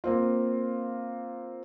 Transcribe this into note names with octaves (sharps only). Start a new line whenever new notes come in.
A#3 C4 F4